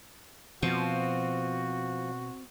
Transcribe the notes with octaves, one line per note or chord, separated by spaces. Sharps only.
B2 F3 C4 F#4